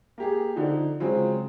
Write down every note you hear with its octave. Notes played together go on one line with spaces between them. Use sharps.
A#3 G4 G#4
D3 F3 D#4
C#3 F#3 G#3 C4 F4